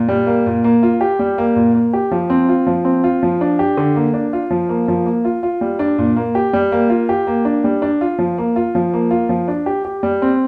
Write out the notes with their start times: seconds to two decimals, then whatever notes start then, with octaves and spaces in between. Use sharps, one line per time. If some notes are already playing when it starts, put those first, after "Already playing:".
Already playing: A#2
0.09 G3
0.27 A#3
0.46 A#2
0.64 A#3
0.83 F4
1.01 G4
1.19 G3
1.38 A#3
1.56 A#2
1.74 A#3
1.93 G4
2.11 F3
2.30 C4
2.49 F4
2.67 F3
2.85 C4
3.04 F4
3.23 F3
3.41 D4
3.59 G4
3.77 D3
3.96 A#3
4.13 D4
4.33 F4
4.51 F3
4.69 A#3
4.88 F3
5.06 A#3
5.25 F4
5.43 F4
5.61 G3
5.79 D4
5.98 A#2
6.16 A#3
6.35 G4
6.53 G3
6.72 A#3
6.90 F4
7.09 G4
7.27 A#3
7.45 D4
7.64 G3
7.82 D4
8.01 F4
8.19 F3
8.38 A#3
8.56 F4
8.75 F3
8.93 A#3
9.11 F4
9.29 F3
9.48 D4
9.66 G4
9.85 G4
10.03 G3
10.22 C4